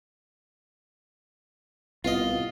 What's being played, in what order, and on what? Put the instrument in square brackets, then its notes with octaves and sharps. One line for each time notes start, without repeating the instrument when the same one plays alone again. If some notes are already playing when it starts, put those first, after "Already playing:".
[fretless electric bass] C2 B3 [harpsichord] F4 D#5